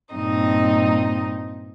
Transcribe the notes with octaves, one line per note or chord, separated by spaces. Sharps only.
G2 A#2 C4 D#4 D#5